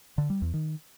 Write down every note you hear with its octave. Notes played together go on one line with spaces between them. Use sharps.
D3
G3
E2
D#3